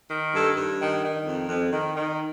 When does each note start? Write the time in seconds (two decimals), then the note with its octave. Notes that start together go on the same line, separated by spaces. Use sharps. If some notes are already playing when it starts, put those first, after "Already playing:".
0.09 D#3
0.33 G2 A4
0.56 G2
0.79 D#3
1.02 D#3
1.25 F2
1.48 F2
1.72 D#3
1.95 D#3